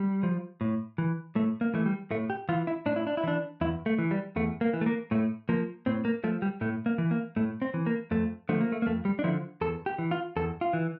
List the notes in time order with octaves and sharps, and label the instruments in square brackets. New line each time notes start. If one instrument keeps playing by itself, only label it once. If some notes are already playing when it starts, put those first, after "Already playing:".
Already playing: [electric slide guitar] G3
F3
A2
E3
A2 A3
A#3
E3 A3
G3
A2 A3
G4
E3 F4
E4
A2 D4
E4
D4
E4
E3 D4
E2 E4
A3
E3
G3
E2 A3
A#3
E3
A3
A#3
A2 A3
F3 A#3
A2 C4
A#3
F3 A3
G3
A2 A3
A#3
E3
A#3
A2 A3
C4
E3
A#3
F2 A3
D3 F3 A3
A#3
A3
A#3
F2 A3
G3
D4
D3 F3 E4
E2 A4
G4
E3
F4
E2 A4
F4
E3